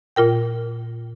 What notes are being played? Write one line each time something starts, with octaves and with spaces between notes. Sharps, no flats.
A#2 F4 A#4 G5